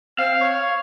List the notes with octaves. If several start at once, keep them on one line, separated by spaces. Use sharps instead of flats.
C4 F5
C#5